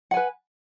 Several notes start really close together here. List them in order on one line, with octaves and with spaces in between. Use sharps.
F#5 G#5 B4